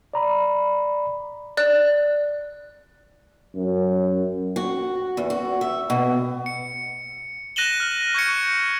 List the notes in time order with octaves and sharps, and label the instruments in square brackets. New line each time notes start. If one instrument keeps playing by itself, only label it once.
[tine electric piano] D5 A#5 B5
[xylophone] D5 F#6
[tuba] F#2
[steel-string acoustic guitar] F#4
E2
F#4
E5
B2
[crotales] C#7
F#6 A#6 D#7 E7 F#7 G7
F6
C#6 G6 G#6 C#7